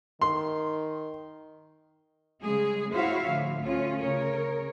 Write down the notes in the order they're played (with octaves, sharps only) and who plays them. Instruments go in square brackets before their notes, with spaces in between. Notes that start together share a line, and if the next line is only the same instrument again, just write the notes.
[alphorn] D#3 [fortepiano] C6
[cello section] C#3 G3 G#3 G#4
E4 F#4 C5 C#5 E5 F5
A2 D3 F3
D2 C#4 F4
C#3 A#4 C#5